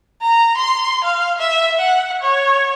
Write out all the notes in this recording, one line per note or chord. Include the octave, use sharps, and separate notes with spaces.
A#5
C6
F5
E5
F#5
C#5